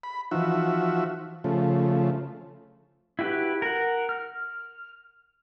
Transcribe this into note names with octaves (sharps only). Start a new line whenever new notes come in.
B5
E3 F3 D#4 F#4 E5
C#3 F3 A3
E4 F#4 G4 B4
A#4 F#5
F6